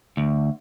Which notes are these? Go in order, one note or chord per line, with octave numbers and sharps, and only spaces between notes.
D2